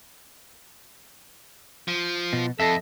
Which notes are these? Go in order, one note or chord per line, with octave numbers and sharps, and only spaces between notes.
F3
B2
F2 A4 D#5 E5